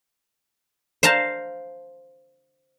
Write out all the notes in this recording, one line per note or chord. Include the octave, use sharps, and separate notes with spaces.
C5 F5 A5 A#5